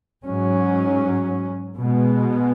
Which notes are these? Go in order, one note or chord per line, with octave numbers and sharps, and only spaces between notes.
G#2 F#3 C#4
B2 G#3 B3